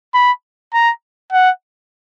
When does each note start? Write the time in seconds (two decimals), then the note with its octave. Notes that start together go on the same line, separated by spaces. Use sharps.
0.14 B5
0.73 A#5
1.32 F#5